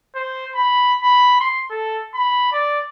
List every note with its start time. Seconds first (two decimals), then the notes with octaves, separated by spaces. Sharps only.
0.15 C5
0.55 B5
1.02 B5
1.40 C6
1.71 A4
2.14 B5
2.52 D5